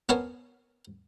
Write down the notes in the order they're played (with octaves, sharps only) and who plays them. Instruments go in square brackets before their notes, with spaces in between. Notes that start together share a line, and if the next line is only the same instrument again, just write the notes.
[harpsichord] B3 A#4 C5 C#5 G#5 A5